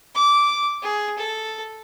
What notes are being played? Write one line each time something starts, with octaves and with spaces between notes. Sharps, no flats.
D6
G#4
A4